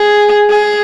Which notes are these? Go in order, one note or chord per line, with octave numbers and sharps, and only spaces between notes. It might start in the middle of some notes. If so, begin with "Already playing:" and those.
Already playing: G#4
G#4